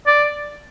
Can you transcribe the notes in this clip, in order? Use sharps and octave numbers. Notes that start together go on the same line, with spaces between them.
D5